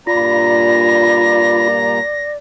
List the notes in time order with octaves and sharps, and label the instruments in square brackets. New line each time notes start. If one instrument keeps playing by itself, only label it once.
[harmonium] G2 A#2 A#5 [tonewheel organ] F4 B5 [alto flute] D5 [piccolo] A#6